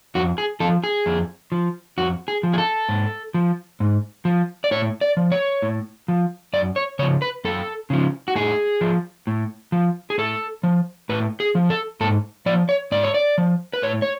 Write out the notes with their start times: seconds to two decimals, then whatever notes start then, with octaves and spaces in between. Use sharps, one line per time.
0.15 F2 F#4
0.38 G#4
0.60 F3 A4
0.84 G#4
1.06 F2
1.52 F3
1.98 F2 F#4
2.28 G#4
2.43 F3
2.53 G#4
2.58 A4
2.89 G#2
3.34 F3
3.80 G#2
4.25 F3
4.64 D5
4.71 A2 C#5
5.01 D5
5.17 F3
5.32 C#5
5.62 A2
6.08 F3
6.53 F#2 D5
6.76 C#5
6.99 C#3 C#5
7.02 F3
7.22 B4
7.45 F#2 A4
7.90 C#3 F3
8.28 F#4
8.35 A2 G#4
8.81 F3
9.27 A2
9.72 F3
10.10 G#4
10.18 A2 A4
10.63 F3
11.09 A2 B4
11.40 G#4
11.55 F3
11.70 A4
12.01 G#2 A4
12.46 F3 D5
12.69 C#5
12.92 G#2 D5
13.03 C#5
13.14 D5
13.38 F3
13.73 B4
13.82 A2 C#5
14.02 C#5